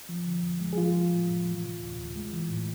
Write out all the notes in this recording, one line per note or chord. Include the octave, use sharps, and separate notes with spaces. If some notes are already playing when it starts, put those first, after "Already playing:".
F3
D3
E2
G#3
G#4
F3 G#3 F4
F3
A2
A2
E3
C3
D2
D2
G#3
E3
A2